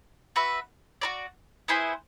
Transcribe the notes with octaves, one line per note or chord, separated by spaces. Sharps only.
F#4 B4 E5
F#4 A#4 D5
B3 E4 G#4 C5